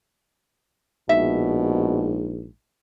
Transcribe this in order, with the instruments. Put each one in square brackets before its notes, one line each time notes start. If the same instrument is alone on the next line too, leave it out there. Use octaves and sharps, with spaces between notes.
[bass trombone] A#1 [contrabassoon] G#2 [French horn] B2 [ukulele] E5